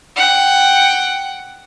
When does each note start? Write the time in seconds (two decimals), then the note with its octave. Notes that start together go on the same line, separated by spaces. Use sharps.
0.15 F#5 G5